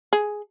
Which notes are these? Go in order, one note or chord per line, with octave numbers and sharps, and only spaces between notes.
G#4